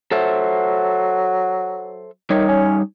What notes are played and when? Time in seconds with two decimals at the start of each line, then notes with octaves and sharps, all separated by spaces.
0.11 F#3 A4 C5 E5
2.30 D#3 G3 D#4 C#5
2.48 C#4